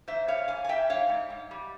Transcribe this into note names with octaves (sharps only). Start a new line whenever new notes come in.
G#2 C5 E5
G3 C#5 F5
G#2 F5 G#5
G#5
G#2 E5 G5
G#2 C#5 F5
G#2
G#2
G3